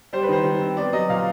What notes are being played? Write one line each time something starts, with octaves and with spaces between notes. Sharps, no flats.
G3 C5
B4
D#3 C5
D#3
C4
B3 D5
F#3 D#5
A#2 F5